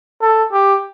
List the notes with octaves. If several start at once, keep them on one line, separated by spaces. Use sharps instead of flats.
A4
G4